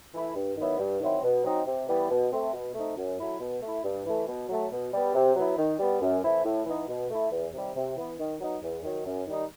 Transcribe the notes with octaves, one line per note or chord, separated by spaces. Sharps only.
E3 A3 E4
G2
D#3 F#3 B3 E4
G2
D#3 F#3 C4 E4
B2
F#3 C4 D#4
C3
E3 G3 B3
B2
A3 C4
B2
A3 C4 D#4
F#2
F#3 A3 E4
B2
A3 E4
G2
E3 A3
B2
F#3 A3
B2
G3 B3
C3
F#3 B3 E4
D#3
G3 B3
F#2
E3 A3 C4 E4
A2
E3 B3 D#4
B2
A3 E4
E2
C3 D#3 G3
C3
E3 B3
D#3
F#3 B3 D#4
E2
D#3 F#3
F#2
D#3 G3 D#4